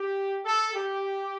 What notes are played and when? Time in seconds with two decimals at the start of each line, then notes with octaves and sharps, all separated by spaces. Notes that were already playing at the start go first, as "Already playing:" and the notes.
Already playing: G4
0.45 A4
0.74 G4